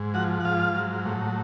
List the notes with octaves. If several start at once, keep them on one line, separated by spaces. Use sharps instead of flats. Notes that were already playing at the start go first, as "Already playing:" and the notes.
Already playing: G#2
F3 F#4 F#5
F#5
G#2 F4 F5
F#3
A2